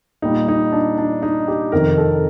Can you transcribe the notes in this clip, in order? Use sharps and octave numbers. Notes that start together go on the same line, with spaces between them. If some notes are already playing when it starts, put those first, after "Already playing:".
A#2 G3 D#4
D#4
D4
D4
D#4
G4
F2 C3 D#3 A#4
A4